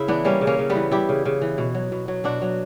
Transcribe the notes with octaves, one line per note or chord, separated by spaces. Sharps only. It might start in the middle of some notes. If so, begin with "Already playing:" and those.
Already playing: C#3 E4
E3 B3 D4
G3 A#3 C#4
C#3
A#3 C#4
C#3
G3 B3
E3
G3 E4 G4
C#3
C#3
E3
B2
F#3
B2
F#3
B2 D4 F#4
F#3